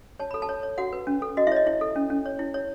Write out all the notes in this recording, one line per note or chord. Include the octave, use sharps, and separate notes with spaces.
C#5 A5
A4 B5
A4 A5
C#5
C#5
F#4 F#5
B4
C#4
A4
F#4 D#5
E4 E5
C#5 D#5
E4
A4
C#4
C#4
C#5
E4
C#5